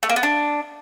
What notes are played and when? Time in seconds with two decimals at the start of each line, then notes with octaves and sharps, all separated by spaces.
0.03 A3
0.10 A#3
0.16 B3
0.23 D4